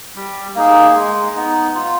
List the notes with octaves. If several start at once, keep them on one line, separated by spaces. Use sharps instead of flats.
G3
A#3 D#4 G#4
G#3
B3 D#4
F4